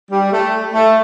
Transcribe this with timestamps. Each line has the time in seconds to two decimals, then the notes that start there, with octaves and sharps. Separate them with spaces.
0.11 G3
0.32 A3
0.73 A3